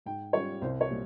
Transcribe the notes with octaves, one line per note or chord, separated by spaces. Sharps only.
G#2 G5
G3 C#4 F4 C#5
C2 C5
C#5
A#2 G3